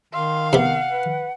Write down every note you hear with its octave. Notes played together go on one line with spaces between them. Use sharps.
D#3 F5 C6
C3 B3 F#5
B4